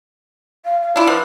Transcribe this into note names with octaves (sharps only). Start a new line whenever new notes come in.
F5
F5
D4 E4 F4
F3 B4